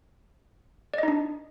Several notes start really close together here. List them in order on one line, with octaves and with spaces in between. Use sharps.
D5 D#5 D#4 D4